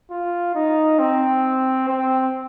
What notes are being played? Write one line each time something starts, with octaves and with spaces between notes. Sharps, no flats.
F4
D#4
C4
C4